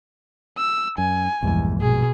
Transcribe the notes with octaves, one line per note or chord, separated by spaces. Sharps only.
E6
F#2 G#5
A#1 E2 G2 G#3
B2 G#4